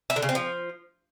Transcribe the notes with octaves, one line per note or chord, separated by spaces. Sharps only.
E4
D3
C#3
C4
F3